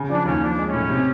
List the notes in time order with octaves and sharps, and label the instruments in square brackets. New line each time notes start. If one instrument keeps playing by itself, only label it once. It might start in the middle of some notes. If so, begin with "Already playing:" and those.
Already playing: [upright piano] C#3
[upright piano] F3 [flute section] D4
[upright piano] D#2 [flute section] C#4
[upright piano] F3 [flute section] D4
[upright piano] G#3
[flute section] C#4
[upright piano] A2
C3